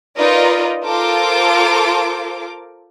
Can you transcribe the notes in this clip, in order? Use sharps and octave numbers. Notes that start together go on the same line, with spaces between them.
D#4 F4 A#4 B4 D5 D#5
F4 A4 A#4 C5 D6